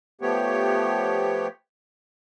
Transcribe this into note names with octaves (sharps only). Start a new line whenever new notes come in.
F3 A3 B3 G4 C#5